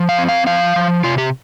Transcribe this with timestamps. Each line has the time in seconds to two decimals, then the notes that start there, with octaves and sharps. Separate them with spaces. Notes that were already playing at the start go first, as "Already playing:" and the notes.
Already playing: F3
0.09 F5
0.18 C4
0.29 F5
0.47 F3 F5
0.76 F3
1.04 C3 F4
1.18 G4